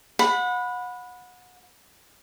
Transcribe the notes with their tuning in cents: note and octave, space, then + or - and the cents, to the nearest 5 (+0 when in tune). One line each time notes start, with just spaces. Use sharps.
F#5 -30 B5 +0